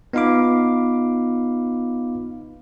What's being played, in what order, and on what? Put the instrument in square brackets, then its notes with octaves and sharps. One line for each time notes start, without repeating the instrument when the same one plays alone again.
[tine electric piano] B3 D#4 F4 F5 B5 D6